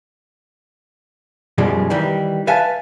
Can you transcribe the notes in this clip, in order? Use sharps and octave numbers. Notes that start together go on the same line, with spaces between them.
F#2 B2 E3 F3 G3 G#3
D#3 E3 G3
B4 E5 F5 G#5 A5